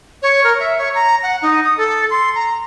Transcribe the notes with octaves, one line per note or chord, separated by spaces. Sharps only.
C#5
A#4
E5
C#5
A#5
F#5
D#4
D#6
A4
C6
A#5